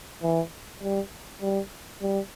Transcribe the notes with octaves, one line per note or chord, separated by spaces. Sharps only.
E3
G3
G3
G3